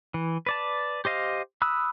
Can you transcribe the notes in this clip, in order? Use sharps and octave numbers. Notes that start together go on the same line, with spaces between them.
E3
B4 D5 A5
G4 C5 D#5 F5
B5 D#6 E6 F#6